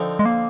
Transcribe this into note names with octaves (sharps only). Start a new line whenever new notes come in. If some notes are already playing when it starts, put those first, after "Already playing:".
Already playing: D3 F3 C4 D#4
G#3
A#3